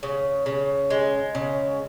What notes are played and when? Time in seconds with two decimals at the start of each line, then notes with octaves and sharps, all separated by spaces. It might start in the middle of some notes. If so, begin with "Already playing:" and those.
0.03 C#3
0.46 C#3
0.90 G#3
1.35 C#3